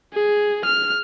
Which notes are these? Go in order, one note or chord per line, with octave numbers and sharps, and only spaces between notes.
G#4
F6